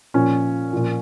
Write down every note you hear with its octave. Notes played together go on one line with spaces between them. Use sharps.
A#2 F3 C#4
A#2 F3